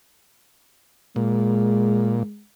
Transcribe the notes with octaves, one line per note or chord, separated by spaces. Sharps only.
A#2 G#3